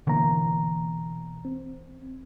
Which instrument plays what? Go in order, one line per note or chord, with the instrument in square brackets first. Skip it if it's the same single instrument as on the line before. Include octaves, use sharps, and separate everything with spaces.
[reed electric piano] B2 A#5 [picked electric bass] D3 E3 A#3
[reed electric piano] C4